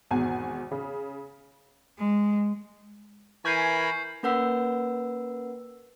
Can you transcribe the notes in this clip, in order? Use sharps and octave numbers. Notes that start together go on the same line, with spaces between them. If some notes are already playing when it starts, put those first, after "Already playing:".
G#1 E2 B2 G#5
C#3
G#3
E3 A#4 G#5 B5 C#6 G6 C7
A#3 C#4 A#4 B4 F#5 E6